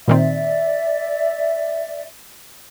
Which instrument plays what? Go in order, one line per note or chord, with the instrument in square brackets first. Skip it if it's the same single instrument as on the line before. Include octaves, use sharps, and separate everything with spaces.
[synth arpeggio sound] A#2 D#3 C4 [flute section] D5 E5